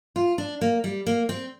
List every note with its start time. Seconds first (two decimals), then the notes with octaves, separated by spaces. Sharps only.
0.16 F4
0.38 D4
0.61 A#3
0.84 G3
1.07 A#3
1.29 C4